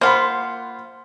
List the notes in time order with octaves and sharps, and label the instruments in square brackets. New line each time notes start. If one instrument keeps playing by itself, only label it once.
[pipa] A#3 F4 [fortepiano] C5 F#5 B5